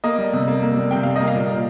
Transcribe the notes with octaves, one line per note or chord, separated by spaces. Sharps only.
A#3 D#5
G3
C3
A#3
A#3
G3
C3 G5
G3 F5
A#3 D#5
F5
A#2
A#2